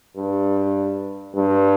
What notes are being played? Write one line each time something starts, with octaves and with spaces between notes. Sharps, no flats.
G2
G2